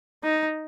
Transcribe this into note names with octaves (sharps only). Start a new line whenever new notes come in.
D#4